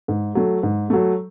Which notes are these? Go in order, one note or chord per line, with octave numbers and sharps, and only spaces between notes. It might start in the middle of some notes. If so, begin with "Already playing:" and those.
G#2
F#3 A3
G#2
F#3 A3